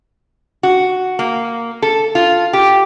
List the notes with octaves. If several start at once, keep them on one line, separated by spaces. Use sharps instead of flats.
F#4
A#3
A4
F4
G4